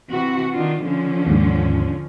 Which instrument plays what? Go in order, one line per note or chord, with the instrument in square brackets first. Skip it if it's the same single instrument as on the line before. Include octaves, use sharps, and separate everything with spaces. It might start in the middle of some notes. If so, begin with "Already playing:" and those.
[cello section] C3 E3 F#4
D#3 D4 F4
D3 F3 C#4
[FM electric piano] D#2 G#2